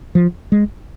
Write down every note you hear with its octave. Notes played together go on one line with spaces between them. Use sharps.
F3
G#3